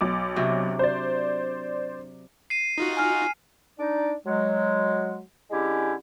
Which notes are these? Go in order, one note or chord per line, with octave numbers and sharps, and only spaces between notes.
B1 D6
C3 F#3 D4
C5 D5
C7 D#7
D#4 F4 F#4
G#5 F6
D4 D#4 D5
F#3 G#3
D3 G#3 C#4 E4 G4